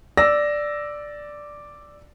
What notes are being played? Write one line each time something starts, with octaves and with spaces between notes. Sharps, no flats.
D5 E6 A#6